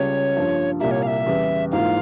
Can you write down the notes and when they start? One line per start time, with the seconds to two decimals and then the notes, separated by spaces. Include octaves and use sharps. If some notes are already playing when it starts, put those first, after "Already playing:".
Already playing: C#2 C#3 G3 C#4 C#5
0.35 G2 F3 A#3
0.80 C2 A#2 G3 A#3 E5
0.91 C#5
1.03 F5
1.07 E5
1.26 E2 C#3 G3
1.72 G#2 E3 A#3 F4 A#4 F5